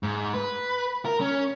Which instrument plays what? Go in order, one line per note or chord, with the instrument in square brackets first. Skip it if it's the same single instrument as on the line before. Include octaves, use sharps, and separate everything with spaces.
[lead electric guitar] G#2
B4
A#4
C#4